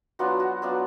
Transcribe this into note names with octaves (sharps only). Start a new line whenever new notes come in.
F#3 B3 D4 F4 F#4
F#4
F#3 B3 D4 F4